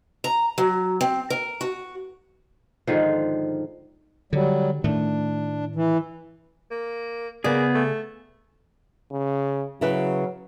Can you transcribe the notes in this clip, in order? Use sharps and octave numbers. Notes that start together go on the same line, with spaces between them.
A#5
F#3
C4
A#4
F#4
G#2 D3 D#3 F3
D3 F#3 G3
A2 D#3 A3 D4
E3
A#3
C#3 A#3 B3 G#4 D5
A3
C#3
C#3 F#3 E4 B4